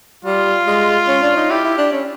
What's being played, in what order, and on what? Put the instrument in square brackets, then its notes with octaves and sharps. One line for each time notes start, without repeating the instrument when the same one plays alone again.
[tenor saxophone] G3 [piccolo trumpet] F4
[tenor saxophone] G#3
C#4
D4
D#4
[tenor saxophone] E4 [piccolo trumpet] G4
[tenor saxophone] E4
D4
C#4